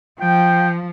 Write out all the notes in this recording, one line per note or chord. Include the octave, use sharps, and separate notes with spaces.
F3 G5